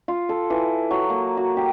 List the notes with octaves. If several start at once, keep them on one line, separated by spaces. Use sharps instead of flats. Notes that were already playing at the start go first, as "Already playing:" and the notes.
F4
A4
E3
F#3
A#3
F#4
G4